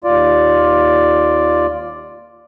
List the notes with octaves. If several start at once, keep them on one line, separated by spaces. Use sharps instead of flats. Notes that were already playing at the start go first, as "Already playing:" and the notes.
D#2 F4 D5